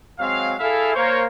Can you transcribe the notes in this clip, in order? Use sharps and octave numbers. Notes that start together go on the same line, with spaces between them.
F#3 G#3 C4 F5
E4 G#4 A4 E5 F5
A#3 C5 C#5